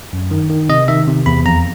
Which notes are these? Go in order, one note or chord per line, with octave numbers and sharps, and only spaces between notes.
F#2
D#3
D#3
C3 D#5
D#3 E5
C3
E2 B5
F2 A#5